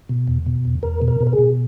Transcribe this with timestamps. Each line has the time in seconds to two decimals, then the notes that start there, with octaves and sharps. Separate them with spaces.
0.09 B2
0.28 E2
0.46 B2
0.65 E2
0.83 E2 A#4
1.02 B2
1.08 A#4
1.20 B2
1.27 A#4
1.33 G#4
1.39 B2